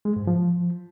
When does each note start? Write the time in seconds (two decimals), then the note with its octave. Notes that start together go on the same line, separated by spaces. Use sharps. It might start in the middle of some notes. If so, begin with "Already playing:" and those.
0.05 G#3
0.16 G#2
0.27 F3